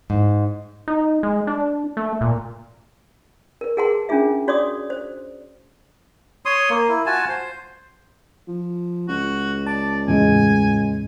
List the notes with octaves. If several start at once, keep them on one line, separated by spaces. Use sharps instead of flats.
G#2
D#4
G#3
D4
A3
A#2
A#4 B4
G#4 A#4 F#5 A5 C6
C#4 D4 F4 G#4 E5
F#4 C#5 D5 C6 D6 D#6
C5
C#5 C6 D#6
A#3
E4
F4 F#4 G#5 A5
C5
F3
C#2 F#4
D5 A5
E2 A2 C#3 G#3 G#5